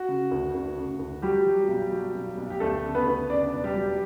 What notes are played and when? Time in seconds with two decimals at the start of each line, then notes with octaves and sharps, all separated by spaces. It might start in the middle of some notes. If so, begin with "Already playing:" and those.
Already playing: F#4
0.09 C#3
0.31 D2
0.54 D2
0.77 C#3
0.99 D2
1.22 F#3 G3 G4
1.46 F#3
1.68 B1
1.92 F#3
2.15 B1
2.38 B1
2.50 G4
2.60 D2 A3 A4
2.84 C#3
2.95 B3 B4
3.07 D2
3.30 C#3 D4 D5
3.53 E1
3.64 G3 G4
3.76 F#3